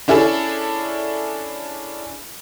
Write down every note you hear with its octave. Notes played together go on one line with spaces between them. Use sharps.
C#4 D4 E4 G#4 A4